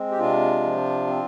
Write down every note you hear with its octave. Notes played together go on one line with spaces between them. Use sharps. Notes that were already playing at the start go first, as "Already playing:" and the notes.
Already playing: G#3 C4
G4
C3 D4 F4
F3
C4